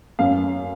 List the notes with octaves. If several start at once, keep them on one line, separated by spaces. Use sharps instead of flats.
F#2 F5